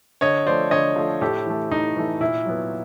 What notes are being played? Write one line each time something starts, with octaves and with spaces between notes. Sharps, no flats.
D3 C#5 D#5
F3 A3 C5 D5
D3 C#5 D#5
F3 A3
A2 G4 A4
E3 A3
A2 D#4
E3 A3
A#2 E4
F#3 B3